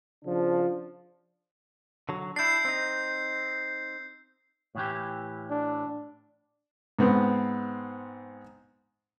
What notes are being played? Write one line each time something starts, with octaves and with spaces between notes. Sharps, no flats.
C#3 F3 D4
D3 F#3
D4 E4 G6 C7
C4 D#4
A2 E3 G4
D4
G#2 B3 C4